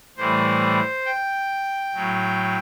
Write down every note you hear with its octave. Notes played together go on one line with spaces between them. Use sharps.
A2 E3 G3 C5
G5
A2 F#3